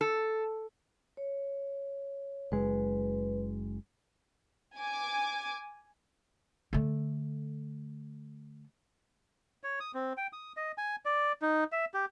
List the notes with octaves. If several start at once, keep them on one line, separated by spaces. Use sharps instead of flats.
A4
C#5
F#1 G#3 B4
G#5 D6
D3 A3
C#5
D#6
C4
G5
D#6
D#5
G#5
D5
D#4
E5
G4